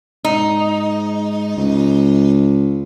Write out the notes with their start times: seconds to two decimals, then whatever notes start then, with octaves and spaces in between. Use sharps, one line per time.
0.25 G#2 D#4
1.57 C#2